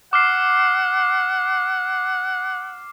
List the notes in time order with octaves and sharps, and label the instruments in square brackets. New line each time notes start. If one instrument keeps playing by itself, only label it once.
[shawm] F#5 [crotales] D6 F6 C7